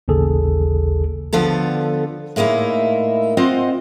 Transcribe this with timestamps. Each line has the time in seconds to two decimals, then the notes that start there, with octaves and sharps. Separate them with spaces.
0.08 A1 D#2 C#3 G#4 A4
1.33 D3 F3 B3 A4
2.36 A2 G#3 A#3 D#4 E4
3.37 C4 F4 C5 D#5 F#5